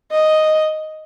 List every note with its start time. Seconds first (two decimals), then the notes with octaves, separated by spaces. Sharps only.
0.11 D#5